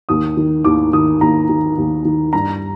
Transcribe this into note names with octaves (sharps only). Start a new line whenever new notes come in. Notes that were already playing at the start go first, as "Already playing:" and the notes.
D#2 D#6
D#3
D#2 D6
D#3 D#6
D#2 A#5
D#3
D#2
D#3
G2 A#5